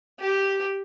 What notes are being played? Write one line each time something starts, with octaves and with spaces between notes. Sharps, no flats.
G4